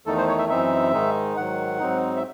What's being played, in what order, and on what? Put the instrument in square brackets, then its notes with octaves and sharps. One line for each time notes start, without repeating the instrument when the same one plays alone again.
[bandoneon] E2 D#3 A3 D#4 A4
C5
C#5
E5
F#2 E3 C4 D#4 E5
G#2 D#3 G#3 D#4
G#2 D#3 F#3 F#5
G#2 F#3 C4 D#4
E5